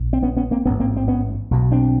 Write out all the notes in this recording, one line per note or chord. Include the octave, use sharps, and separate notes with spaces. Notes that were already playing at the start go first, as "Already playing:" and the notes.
Already playing: A#1
C4
B3 C#4
B3 C#4
A#3 C4
A1 G#2 B3 C#4
A#3 C4
C4
B3 C#4
B1 B2
C4 D4